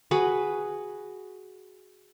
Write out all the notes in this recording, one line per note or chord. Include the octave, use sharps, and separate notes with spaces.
F#4 G#4 B4